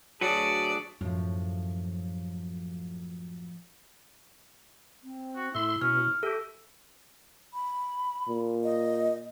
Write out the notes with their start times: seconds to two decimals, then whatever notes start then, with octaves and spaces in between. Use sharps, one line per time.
0.21 D2 F#3 D4 F#4 G#4 B4 D5 A5
1.01 F#2 A2 F3
5.04 C4
5.36 F#4
5.55 A2 E4 E5 C6
5.82 B2 C#4 F6
6.23 G4 A4 E5
7.54 B5
8.28 A#2
8.64 D#5